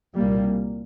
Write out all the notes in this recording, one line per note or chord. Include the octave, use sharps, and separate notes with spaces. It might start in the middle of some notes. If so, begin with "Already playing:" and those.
C2 A#2 G3 A#3